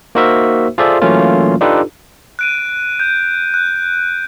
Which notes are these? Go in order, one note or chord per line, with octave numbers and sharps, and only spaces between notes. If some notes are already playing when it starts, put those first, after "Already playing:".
A#3 D#4 F#4 A#4 C5 E5
F4 G#4 A4 C5 D5 E5
E3 F#3 A3 A#3 C#4 F4
D4 D#4 F4 G4 A4 B4
F#6 D7 D#7
G6
F#6